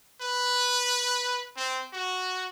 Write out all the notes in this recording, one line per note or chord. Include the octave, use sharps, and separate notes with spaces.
B4
C4
F#4